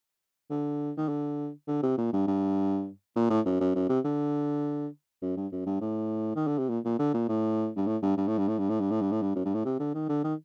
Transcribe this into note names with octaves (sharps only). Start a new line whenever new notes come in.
D3
D#3
D3
D3
C3
A#2
G2
G2
A#2
A2
F#2
F#2
F#2
C3
D3
F#2
G2
F#2
G2
A2
D#3
D3
C3
A#2
A#2
D3
A#2
A2
G2
A2
G2
G2
A2
G2
A2
G2
A2
G2
A2
G2
A2
G2
F#2
G2
A2
C3
D3
D#3
D3
D#3